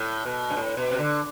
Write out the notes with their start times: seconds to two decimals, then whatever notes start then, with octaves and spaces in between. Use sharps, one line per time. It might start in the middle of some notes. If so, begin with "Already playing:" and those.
Already playing: A2
0.26 B2
0.50 G2
0.57 A2
0.77 B2
0.91 C3
0.99 D3